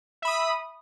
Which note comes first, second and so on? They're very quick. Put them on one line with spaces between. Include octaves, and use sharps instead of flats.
E5 B5 D#6